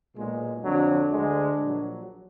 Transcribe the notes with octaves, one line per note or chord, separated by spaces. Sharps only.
B1 A#2 G#3
F2 D3 F#3 D4
D2 D3 G#3
A#1 A#2 F#3